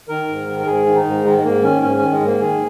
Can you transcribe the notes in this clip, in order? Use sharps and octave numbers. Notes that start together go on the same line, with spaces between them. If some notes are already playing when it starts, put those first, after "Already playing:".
D#3 A#4
G#2
D#3
A#4
G#2 G#4
D#3
D#4
G#2
D#3 G#3
G#3
G#2 A#3
D#3 C#4
G#2 C#4
D#3 C#4
G#3
G#2 A#3
D#3 G#4